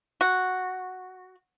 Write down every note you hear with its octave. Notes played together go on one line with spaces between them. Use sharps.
F#4